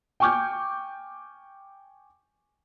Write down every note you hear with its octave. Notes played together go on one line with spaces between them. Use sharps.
G5 G#5 C#6 D6 F6 G6